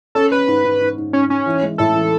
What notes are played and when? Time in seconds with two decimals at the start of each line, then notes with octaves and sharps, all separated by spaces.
0.15 C#4 A4
0.32 C#4 B4
0.48 G#2
0.64 G#2
0.80 G#2
0.98 G#2
1.13 G#2 C#4
1.30 G#2 C#4
1.46 E3
1.62 G#3
1.78 A2 A4
1.95 E3